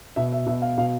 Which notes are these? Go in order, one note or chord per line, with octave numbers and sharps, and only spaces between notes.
B2 E5
E5
B2 E5
F5
B2 F5